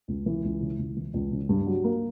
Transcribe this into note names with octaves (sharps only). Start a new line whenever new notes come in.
C#2
E3
C#2
C#3
C#2
E3
C#2
C#3
G2
F#3
A#3